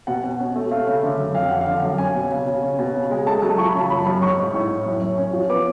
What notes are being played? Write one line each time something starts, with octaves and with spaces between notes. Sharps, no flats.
B2 F#5
B2
C#4
A3
A3 F5
C#3
D3
F#2
F2 F5
F2 F#5
F5
D3
F#2
C#4 G#5
B2
C#3
C#3
C#4
B2
C#3
G#3
A3 A5
F#3 A5
F3 C#6
B5
C#3 A5
F#2 B5
F#2
G#2 C#6
G#2
A2
A2
F#2
F#2
C#4
F3
B3 D6